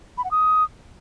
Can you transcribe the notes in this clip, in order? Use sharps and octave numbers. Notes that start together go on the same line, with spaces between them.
B5
F#5
D#6